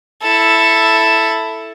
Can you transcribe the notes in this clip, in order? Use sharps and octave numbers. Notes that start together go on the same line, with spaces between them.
E4 A4